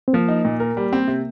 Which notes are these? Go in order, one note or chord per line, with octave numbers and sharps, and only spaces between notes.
C4
F3 A#3
D#4
A#2
A#4
G3
C4
C3